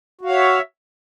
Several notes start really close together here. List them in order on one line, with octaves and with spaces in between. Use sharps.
F#4 F5 C#5 E5